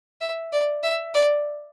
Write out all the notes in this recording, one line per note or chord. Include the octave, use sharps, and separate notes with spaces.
E5
D5
E5
D5